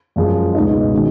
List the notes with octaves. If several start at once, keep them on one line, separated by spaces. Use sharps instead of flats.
F#2 F3 G#3
C#2 B2 G#3 B3 D#4
D#3 G#3 C#4 F#4